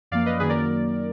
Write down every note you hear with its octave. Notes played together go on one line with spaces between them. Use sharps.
F#2 F3 A#3 D5 F5
B4 D#5
F#2 D#3 F#3 A#3 G#4 B4
A#4 D5